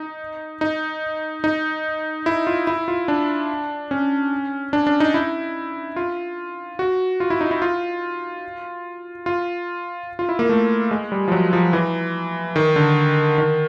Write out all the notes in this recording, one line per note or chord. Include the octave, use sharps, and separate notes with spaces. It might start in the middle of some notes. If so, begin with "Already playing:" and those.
Already playing: D#4
D#4
D#4
E4
F4
E4
F4
D4
C#4
D4
D4
D#4
E4
F4
F#4
F4
E4
D#4
E4
F4
F4
F4
E4
A#3
A3
G#3
G3
F3
F#3
F3
E3
D#3
D3
D#3